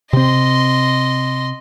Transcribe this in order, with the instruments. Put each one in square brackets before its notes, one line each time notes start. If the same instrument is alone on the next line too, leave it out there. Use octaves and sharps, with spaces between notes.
[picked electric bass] C3 C4 [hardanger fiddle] D#5 C6